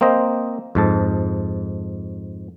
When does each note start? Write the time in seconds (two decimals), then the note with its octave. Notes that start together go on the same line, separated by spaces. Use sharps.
0.01 A#3 C4 C5 D#5
0.75 F2 G#2 A5